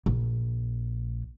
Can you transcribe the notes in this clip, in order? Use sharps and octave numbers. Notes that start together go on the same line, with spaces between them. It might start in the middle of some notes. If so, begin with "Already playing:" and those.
A#1